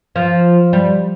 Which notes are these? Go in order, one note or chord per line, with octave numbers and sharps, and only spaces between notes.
F3
G3